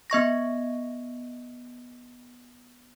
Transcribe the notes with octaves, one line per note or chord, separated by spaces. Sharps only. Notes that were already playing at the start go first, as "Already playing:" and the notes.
B3 D#5 C#6 A#6